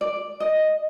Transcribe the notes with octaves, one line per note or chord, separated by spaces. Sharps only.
D5
D#5